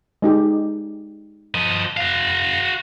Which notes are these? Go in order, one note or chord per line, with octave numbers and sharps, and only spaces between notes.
G#3 D#4 G4
F3 D#5
F#4 F5